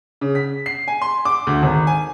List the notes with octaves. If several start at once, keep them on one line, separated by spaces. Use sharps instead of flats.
C#3
B6
C7
G#5
C6
D6
D2
G#1
G#5